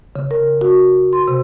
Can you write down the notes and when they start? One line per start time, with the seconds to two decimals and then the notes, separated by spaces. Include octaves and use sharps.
0.16 C#3
0.31 A#4
0.61 F#4
1.13 C6
1.28 C3